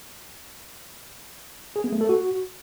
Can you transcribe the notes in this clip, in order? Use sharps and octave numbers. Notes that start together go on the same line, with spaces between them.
G#4
B3
A3
A4
F#4